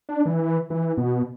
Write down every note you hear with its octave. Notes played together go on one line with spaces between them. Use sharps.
D4
E3
E3
B2